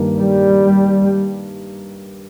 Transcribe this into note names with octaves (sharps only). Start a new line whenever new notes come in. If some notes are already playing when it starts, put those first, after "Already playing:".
Already playing: G2 D#3 A#3
G3